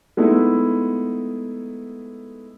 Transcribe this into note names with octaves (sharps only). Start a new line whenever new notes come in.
G#3 A3 B3 D#4 E4